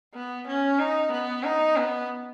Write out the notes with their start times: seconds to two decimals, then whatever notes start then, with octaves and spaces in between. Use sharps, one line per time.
0.14 B3
0.47 C#4
0.79 D#4
1.12 B3
1.44 D#4
1.77 B3